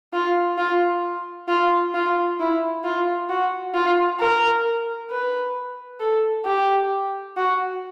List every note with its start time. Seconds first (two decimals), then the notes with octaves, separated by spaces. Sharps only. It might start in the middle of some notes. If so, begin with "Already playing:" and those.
0.13 F4
0.58 F4
1.48 F4
1.94 F4
2.39 E4
2.84 F4
3.29 F#4
3.74 F4
4.19 A#4
5.11 B4
6.00 A4
6.46 G4
7.37 F#4